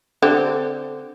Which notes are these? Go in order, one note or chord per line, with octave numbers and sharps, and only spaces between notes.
D3 C4 G4